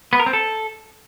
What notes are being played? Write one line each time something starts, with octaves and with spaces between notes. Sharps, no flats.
B3
A#4
C4
A4